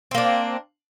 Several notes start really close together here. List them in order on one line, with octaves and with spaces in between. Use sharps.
C4 A#3 D4